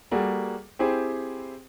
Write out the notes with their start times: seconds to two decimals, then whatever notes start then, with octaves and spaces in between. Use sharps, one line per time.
0.11 G3 A#3 F#4 G#4 A4
0.79 C4 E4 G4 G#4 C5